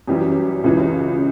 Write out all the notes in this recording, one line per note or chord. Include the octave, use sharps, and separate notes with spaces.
F#2 E3 G3 C#4 G4
C#2 C#3 E3